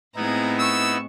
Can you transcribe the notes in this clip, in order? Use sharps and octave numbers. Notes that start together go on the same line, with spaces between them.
A2 G#3 B3 C4 D#4 E4 A#5 G#6
C#6 E6 E7